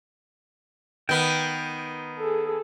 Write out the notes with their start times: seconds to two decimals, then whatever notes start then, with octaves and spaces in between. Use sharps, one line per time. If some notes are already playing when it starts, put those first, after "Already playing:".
1.09 D#3 B3 G5
2.17 G#4 A4